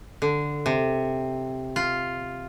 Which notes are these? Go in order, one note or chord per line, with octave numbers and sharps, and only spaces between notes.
D3
C3
F4